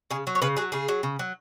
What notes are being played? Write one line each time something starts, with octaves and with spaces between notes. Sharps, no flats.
C#3 G#4
F#3
C#5
C#3 B4
F#3 G#4
C#3 G#4
F#3
C#3
F#3